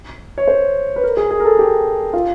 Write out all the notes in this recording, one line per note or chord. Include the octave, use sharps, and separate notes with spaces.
C#5
C5
B4
A#4
G#4
G#4
A#4
A4
G4
F4